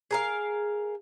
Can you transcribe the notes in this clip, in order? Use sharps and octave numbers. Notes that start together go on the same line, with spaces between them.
G#4 A#4 F5